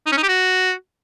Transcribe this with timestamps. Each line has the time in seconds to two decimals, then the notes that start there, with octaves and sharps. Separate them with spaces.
0.06 D#4
0.12 C#4
0.17 D#4
0.23 G4
0.28 F#4